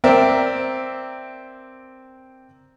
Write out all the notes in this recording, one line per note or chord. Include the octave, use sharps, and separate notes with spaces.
C4 A#4 D5 E5 G5